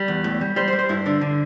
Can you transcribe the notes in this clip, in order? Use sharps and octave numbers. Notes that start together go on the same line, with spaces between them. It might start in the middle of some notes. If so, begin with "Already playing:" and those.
Already playing: G3
E2
A2
G3
G3 C5
C5
G3
C5
G2 E4
D3 D4
D3